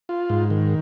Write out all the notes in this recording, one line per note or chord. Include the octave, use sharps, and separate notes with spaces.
F4
G#2
D#3